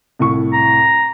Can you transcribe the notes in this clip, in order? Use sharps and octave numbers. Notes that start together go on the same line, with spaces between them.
C2 A2 C#6
A#5